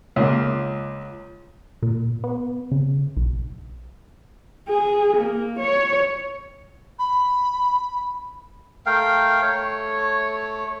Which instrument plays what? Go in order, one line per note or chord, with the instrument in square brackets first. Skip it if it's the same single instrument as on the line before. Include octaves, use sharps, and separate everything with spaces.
[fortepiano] C#2 A#3
[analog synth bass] A#2
B3
C#3
B1
[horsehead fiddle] G#4
A#3
C#5
[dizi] B5
[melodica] A3 A#4 F5 G5
A3 C#5